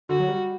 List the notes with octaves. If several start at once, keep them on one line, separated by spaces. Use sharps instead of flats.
D3 F#4
F#3
G3